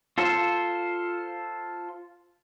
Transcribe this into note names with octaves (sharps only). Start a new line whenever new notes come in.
F4 A4 C5